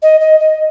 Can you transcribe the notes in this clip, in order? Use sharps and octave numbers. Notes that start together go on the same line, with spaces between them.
D#5
D#5
D#5